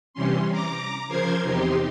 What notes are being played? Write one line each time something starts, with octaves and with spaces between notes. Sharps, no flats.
C3 E3 G3 C#4 C6
A#5 D6
C#3 F3 A#4 C5 C6 G#6
E2 C3 D#4 G4 C6